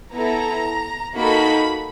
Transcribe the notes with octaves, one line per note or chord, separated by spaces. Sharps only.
B3 E4 A4 A#5
A#3 D#4 F#4 A4 B5